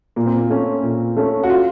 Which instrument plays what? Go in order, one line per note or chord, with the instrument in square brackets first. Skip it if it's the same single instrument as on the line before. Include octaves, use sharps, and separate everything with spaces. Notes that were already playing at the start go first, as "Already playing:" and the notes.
[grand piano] A#2 [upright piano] A#3
[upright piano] C4
A#3
[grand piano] A3 C#4
A#2
A3 C#4
[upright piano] F#4
F4